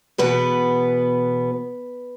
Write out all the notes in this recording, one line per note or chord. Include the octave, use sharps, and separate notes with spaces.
E2 B2 B3 B4